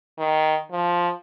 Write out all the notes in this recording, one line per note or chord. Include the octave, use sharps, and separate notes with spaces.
D#3
F3